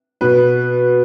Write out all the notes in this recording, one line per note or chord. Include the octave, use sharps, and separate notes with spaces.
B2 B4